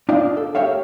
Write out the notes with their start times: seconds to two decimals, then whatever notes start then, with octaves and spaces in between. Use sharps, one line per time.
0.09 D4 F4 D5 D#5 F5 G5
0.37 A4
0.55 G4 A#4 C#5 E5 F5